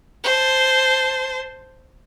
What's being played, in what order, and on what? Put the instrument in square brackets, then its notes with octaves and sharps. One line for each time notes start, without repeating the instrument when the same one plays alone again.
[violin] C5 A5